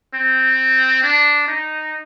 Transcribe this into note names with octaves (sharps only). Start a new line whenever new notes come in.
C4
D4
D#4